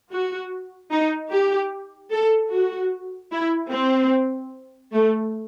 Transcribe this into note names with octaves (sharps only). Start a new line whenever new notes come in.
F#4
D#4
G4
A4
F#4
E4
C4
A3